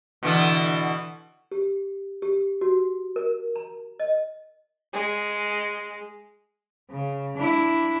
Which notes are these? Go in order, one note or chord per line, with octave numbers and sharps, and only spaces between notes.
B2 D3 E3
G4
G4
F#4
A#4
A#5
D#5
G#3
C#3
D4 E4